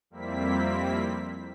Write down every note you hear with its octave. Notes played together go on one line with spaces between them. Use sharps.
F2 G3 A#3 C4 E4 B6